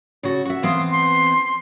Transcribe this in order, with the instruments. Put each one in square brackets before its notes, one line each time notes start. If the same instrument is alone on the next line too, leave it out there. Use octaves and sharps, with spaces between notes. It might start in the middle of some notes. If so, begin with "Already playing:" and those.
[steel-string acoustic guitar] C#3 F#4 A4
F#4 E5
[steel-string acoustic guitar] E3 B3 C4 [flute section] F5 C6 D#6
[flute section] C6